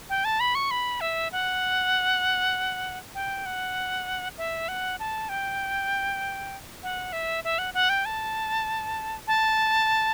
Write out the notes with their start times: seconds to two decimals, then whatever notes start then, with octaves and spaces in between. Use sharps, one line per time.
0.10 G5
0.25 A5
0.40 B5
0.55 C#6
0.71 B5
1.01 E5
1.32 F#5
3.15 G5
3.46 F#5
4.38 E5
4.68 F#5
4.99 A5
5.29 G5
6.83 F#5
7.13 E5
7.44 E5
7.59 F#5
7.74 F#5
7.89 G5
8.05 A5
9.28 A5